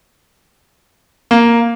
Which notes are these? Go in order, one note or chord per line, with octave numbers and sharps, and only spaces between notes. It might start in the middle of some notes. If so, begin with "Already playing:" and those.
A#3